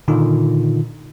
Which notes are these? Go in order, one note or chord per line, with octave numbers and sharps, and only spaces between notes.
A#2 D3 D#3 D#4 F4